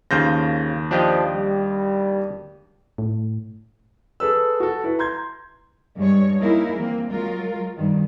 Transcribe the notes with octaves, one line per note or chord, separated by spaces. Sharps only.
D#2 C#3 F4 C5 G6 A#6
F3 D4 G4 D#5
G3
A2
G#4 A4 B4 E6
F#4 A4
E4 B4
A#5 C6 G6 G#6
G2 G#3 C#5
A#3 D#4 E4 G#4 A#4
E3 A#3 C4
F#3 G#3 F4 A#4
G2 D#3